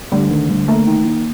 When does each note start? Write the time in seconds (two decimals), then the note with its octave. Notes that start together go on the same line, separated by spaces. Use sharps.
0.12 D2 G3
0.31 D2 D#3
0.49 D2 G3
0.68 A3 A#3
0.87 D#3
1.05 D#3 A#3